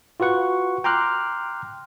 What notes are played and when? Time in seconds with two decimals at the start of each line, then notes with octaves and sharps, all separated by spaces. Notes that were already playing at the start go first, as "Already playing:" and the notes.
0.20 F4 F#4 B4 F#5 C#6
0.84 G5 A#5 C6 D6 F6 F#6